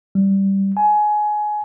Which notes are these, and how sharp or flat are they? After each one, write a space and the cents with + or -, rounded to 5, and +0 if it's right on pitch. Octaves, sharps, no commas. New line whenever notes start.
G3 -5
G#5 +20